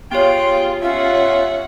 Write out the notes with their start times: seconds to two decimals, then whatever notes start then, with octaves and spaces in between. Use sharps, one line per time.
0.11 B3 F4 G4 G#4 C#5 G5
0.82 C#4 F4 E5 F#5